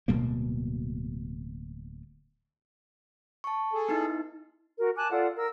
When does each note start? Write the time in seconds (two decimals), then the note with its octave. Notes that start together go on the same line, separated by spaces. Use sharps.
0.08 D1 B2 G3 A#3
3.44 A5 C#6
3.73 G#4 A4
3.89 B3 D#4 E4
4.78 F#4 A#4
4.97 G#5 A5 D6 F#6
5.11 F4 A4 D5 F#5
5.36 A#4 E6